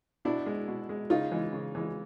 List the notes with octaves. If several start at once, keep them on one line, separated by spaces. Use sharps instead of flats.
B2 D4 E4
G#3
B2
G#3
C#3 D#4 F4
E3 G#3
C#3
E3 G#3